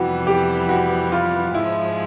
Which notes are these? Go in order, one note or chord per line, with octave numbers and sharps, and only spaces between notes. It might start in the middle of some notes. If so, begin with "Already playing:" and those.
Already playing: F2 C3 E3 G3 B3 F#4
G4
F#4
F4
G#2 F3 G#3 E4